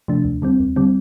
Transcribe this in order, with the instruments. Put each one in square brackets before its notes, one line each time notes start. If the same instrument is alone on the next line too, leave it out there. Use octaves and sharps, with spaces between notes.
[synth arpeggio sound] C3 F3 A3 D4
D#2
D3 G3 C4
D#2
D3 G3 C4